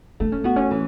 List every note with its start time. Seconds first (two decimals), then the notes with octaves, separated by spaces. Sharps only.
0.20 A3 D4
0.32 C#4
0.44 B3 F#4
0.56 C#4
0.71 E3